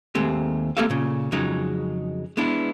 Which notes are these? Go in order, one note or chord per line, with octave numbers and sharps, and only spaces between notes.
D#2 G#3 A3 C4 G4
A#3 C4 G4 A4 E5 F5
A#2 C#3
F2 C#3 F#3 G#3 D#4
G#3 B3 D4 E4